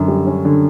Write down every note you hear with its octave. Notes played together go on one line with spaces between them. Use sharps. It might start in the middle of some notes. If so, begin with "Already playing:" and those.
Already playing: F#2 D3 C#4
G3
C#4
D3